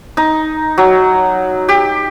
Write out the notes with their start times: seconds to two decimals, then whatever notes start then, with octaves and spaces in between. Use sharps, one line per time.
0.17 D#4
0.78 F#3
1.69 G4